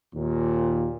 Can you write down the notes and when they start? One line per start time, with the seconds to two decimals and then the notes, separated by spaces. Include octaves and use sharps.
0.15 D#2 A#2